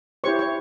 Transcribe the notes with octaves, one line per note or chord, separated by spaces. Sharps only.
E4 G4 C5 C#5 C#6
C#5 C#6